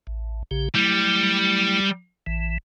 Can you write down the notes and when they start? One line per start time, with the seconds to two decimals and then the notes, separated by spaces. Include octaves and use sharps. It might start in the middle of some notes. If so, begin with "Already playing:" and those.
0.07 A1
0.51 A#1 C#3 G4
0.75 F#3 G3 A3 E4
2.27 A1 E3